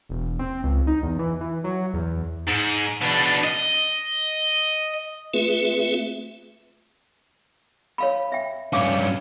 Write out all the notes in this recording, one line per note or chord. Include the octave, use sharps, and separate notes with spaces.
E1
C4
C#2
D#4
E2
E3
E3
F#3
E2
G#2
B2 D4
D#5
A3 C4 F4 G#4 B4 E5
C#5 F5 B5
E5 G5
G2 C#4 F5 D6